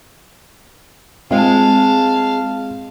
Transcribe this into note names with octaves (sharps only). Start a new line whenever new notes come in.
G#3 C4 F4 F5 A5